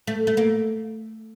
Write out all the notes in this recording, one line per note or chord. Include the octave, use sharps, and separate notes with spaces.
A3
A3
A#3